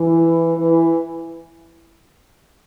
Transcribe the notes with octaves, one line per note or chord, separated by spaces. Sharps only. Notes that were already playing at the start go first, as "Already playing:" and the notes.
Already playing: E3
E3